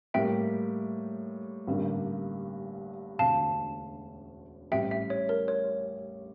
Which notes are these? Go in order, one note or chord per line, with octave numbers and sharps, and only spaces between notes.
A2 G3 A#3 E5 G5
A1 G2 D3 G3 A#3
E1 D2 D3 F5 A5
A1 A2 G3 E5 G5
E5
C#5
A#4
C#5